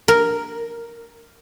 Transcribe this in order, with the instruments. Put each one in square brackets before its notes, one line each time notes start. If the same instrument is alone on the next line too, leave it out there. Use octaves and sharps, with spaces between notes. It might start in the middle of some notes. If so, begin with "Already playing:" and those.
[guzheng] A#4